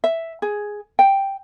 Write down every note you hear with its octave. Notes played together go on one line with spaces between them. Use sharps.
E5
G#4
G5